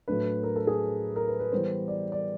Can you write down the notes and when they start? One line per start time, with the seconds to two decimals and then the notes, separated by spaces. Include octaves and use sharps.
0.08 A2 F#3 A3 D4 B4
0.43 A#4
0.56 A4
0.67 G#4
1.16 A#4
1.28 B4
1.39 B4
1.52 E3 G3 B3 C5
1.88 D5
2.12 D5